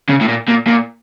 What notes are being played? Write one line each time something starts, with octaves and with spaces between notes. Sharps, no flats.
C#3
A2
A#2
A#2
A#2